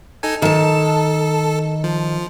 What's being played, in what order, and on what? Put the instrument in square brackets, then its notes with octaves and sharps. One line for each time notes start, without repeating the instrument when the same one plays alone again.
[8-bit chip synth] D#4 A4 G#5
[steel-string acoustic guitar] D#3 A5 [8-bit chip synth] A4
[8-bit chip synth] F3